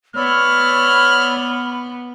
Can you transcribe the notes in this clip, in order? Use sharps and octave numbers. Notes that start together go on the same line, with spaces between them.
B3 C#5 D5 B5 E6 F6